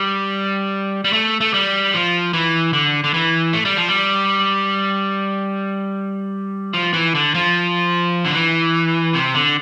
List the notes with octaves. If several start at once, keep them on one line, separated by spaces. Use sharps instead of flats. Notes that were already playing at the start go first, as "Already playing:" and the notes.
Already playing: G3
G3
A3
A3
G3
F3
E3
D3
D3
E3
A3
G3
F3
G3
F3
E3
D3
F3
D3
E3
C3
D3